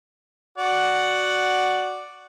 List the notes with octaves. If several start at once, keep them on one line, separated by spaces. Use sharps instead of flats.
F#4 D5 F#5